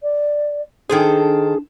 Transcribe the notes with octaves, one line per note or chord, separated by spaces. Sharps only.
D5
D#3 D4 G#4 A4 C5